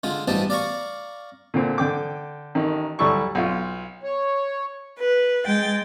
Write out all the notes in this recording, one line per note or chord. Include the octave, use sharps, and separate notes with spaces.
D3 G#3 F4
A1 B2 F3 G3 D#4 A5
D5 F5 A#5 C#6
A#2 D3 C4
D3 G5 D6
A1 D#3
D2 F#3 G3 E4 A4 C#6
B1 F4
C#5
B4
G#3 G5 A6